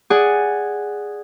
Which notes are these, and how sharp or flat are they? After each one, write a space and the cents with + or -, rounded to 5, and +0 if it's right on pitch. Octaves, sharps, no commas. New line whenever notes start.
G#4 -5 D5 +0 F#5 +0